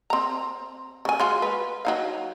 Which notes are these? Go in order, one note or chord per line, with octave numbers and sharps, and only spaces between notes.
C4 A#5
C#3 G#5
G#3 F4 F#4
B4
F#3 D#4 F5